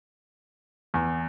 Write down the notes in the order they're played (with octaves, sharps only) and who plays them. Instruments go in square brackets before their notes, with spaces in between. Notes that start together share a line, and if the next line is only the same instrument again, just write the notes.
[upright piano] E2